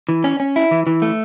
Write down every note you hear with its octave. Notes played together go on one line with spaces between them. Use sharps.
E3
C#4
C#4
E4
E3
E3
A3